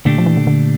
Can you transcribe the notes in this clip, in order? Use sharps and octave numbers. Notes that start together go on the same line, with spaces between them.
A#2 D3 A3 D4 G4
F3
E3
D3
D3